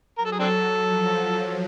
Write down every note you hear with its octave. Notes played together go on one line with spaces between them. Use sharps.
F#3 A#4
A4
G#4
C4 D4 A4
F3